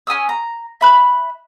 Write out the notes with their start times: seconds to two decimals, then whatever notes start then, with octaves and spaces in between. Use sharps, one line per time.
0.07 C#4 G#5 D#6 E6
0.29 A#5
0.81 E5 B5 F#6